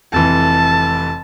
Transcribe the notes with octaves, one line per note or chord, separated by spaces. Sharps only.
F1 F2 E3 A5